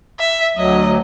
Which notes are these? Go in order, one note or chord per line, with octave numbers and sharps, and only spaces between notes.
E5
D2 F#3 D#5